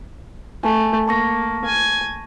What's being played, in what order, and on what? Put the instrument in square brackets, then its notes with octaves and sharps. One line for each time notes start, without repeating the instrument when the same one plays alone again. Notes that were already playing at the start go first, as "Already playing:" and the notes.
[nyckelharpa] A3 [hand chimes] G#5 A5
[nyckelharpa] A#3 [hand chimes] A5 C#6 A#6
[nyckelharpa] G#5